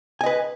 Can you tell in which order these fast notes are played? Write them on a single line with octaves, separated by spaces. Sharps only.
G#5 D#5 B4